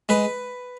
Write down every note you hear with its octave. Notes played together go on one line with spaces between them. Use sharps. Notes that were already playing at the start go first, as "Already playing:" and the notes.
G#3 B4